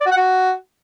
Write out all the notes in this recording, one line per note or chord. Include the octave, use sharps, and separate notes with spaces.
D5
F#4
F#5
F#4